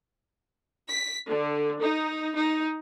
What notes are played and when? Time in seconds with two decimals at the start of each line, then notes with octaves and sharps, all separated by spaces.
0.88 B6
1.29 D3
1.83 D#4
2.36 D#4